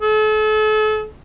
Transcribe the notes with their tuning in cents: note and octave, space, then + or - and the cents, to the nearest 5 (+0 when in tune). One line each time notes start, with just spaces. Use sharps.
A4 -40